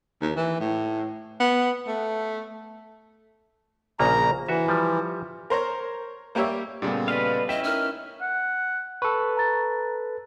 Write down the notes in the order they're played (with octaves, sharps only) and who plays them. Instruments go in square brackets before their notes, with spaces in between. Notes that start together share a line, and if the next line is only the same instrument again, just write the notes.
[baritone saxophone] D#2
E3
A2
B3
A3
[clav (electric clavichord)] A#1 C#3 A#3 [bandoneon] A#5
[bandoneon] E3 [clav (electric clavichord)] F#4 E5
[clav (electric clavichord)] F3 G3
[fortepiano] A#4 C5 C#5 A#5
G3 A#3 G4 C#5 E5
[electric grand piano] A#2 C#3 F4 [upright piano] G3 A3 B3
[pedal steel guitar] B4 D#5 F5 [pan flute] D5
[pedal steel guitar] C#4 E4 G4 [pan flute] D#5 [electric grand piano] G5 B6 [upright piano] E7
[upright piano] D#4 A#4 [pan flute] F6
[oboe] F#5
[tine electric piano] A4 B4 [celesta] C#6
[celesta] A#5 A6